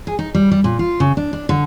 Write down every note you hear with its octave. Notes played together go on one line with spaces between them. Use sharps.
G#4
D#4
G3
G3
A#2
F4
C#3
D4
D4
D3